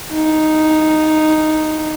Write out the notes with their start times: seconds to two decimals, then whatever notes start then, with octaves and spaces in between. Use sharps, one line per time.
0.13 D#4